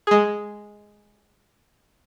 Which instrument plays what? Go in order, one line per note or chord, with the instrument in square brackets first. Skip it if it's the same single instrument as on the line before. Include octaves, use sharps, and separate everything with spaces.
[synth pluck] G#3 G#4